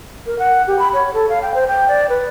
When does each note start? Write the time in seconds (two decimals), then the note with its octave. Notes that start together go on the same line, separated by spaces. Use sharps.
0.26 A#4
0.39 F#5
0.67 G4
0.79 B5
0.93 C#5
1.13 A4
1.29 F5
1.42 G5
1.54 C5
1.67 G5
1.88 D5
2.09 B4